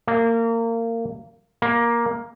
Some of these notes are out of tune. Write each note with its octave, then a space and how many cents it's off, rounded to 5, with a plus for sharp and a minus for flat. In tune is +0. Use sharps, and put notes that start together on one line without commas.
A#3 -25
A#3 +10